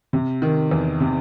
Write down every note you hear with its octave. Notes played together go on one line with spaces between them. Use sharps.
C3
D#3
E2
C3